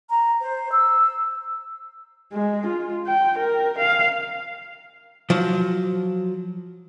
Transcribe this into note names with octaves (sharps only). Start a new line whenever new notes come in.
A#5
C5
E6
G#3
F4
G5
A#4
F5
F3 F#3